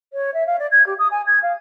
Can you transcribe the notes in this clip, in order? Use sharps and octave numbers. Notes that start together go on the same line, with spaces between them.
C#5
E5
F5
D5
G#6
G4
D#6
G#5
G#6
F5